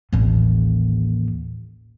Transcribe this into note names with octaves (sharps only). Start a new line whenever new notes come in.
A1 D#2